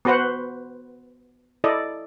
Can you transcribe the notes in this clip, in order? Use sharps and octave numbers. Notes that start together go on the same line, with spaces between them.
B3 F#4 B4 C5 F#5
E4 A4 D5 D#5